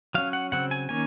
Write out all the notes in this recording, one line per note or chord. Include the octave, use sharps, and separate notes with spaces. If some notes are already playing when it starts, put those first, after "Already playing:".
F#3 C#4 F5
F#5
C#3 F#3 C4 F#5
G#5
D#3 A#3 C#4 G#5